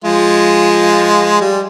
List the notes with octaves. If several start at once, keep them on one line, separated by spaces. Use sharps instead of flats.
F3 G#3 F4
G3